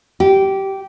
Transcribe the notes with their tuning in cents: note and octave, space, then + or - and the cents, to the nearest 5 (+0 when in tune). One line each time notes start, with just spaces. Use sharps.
G4 -15